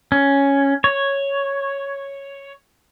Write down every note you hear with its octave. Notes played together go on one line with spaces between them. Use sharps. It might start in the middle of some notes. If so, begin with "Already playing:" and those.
C#4
C#5